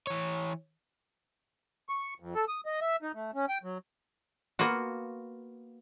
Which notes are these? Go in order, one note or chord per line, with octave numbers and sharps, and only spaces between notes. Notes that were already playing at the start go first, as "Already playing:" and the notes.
E3 C#5
C#6
F2
A4
D#6
D#5
E5
D#4
A3
C#4
G5
F#3
A#3 B3 F4 F#4